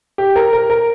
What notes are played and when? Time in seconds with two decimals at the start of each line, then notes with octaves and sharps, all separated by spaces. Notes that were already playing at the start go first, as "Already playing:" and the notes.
0.18 G4
0.36 A#4
0.53 A#4
0.70 A#4